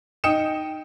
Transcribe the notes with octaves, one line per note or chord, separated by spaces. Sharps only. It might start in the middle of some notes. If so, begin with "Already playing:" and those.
D#4 G5 D#6 C#7 E7